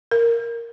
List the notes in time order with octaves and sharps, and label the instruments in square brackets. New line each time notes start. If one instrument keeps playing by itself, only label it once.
[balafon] A#4